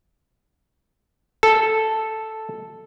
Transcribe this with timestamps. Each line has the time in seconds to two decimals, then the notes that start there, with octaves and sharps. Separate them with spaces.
1.43 A4